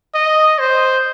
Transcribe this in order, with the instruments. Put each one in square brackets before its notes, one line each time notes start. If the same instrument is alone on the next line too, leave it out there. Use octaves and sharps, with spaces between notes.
[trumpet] D#5
C5